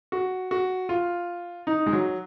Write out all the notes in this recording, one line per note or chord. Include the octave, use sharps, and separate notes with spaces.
F#4
F#4
F4
D#4
G#3
F#3